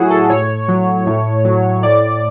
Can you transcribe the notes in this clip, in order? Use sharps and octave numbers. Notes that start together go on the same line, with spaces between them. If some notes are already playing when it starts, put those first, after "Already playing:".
Already playing: A2 F#3 E4 F#4 G#4
A4
A2 C#5
F#3
A2
F#3
A2 D5